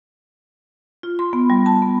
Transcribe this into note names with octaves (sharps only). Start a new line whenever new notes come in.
F4
C6
B3
G3
A5
B3